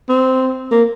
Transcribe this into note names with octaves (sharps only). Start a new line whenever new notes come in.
C4
A#3